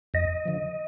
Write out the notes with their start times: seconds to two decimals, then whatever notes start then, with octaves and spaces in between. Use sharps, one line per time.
0.14 F2 D#5
0.45 D3 F3